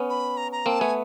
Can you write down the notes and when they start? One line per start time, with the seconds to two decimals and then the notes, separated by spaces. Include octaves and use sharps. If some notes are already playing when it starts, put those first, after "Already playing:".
Already playing: B3 C#4
0.09 B5
0.37 A#5
0.52 A#5
0.66 A#3 C4 A5
0.80 A3 B3 G#5